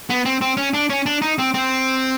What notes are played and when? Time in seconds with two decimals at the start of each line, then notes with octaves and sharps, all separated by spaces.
0.10 B3
0.25 C4
0.41 C4
0.57 C#4
0.74 D4
0.90 C#4
1.06 D4
1.22 D#4
1.38 C4
1.54 C4